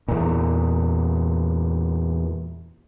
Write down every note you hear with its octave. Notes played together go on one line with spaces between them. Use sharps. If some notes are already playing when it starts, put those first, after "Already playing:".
E2 A#2